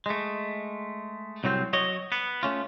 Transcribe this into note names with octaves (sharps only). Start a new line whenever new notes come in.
G#3 A3
C2 F#3 A3 C4
F#3 C#5 D#5
B3
A3 C#4 F4